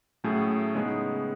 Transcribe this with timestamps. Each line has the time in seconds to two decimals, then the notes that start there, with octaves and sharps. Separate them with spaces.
0.24 A2 F#3 A3 C#4 G#4
0.75 C#3 G#3 B3 D#4 G#4